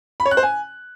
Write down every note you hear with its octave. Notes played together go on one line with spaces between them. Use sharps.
B5
C#5
F#6
C5
G#5